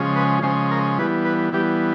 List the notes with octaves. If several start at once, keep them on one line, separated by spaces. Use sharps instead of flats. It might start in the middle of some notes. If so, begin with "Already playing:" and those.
Already playing: C#3 F3 G#3 C#4
B4
C#3 F3 G#3 C#4 C5
A#4
E3 G3 B3 B4
B4
E3 G3 B3 G4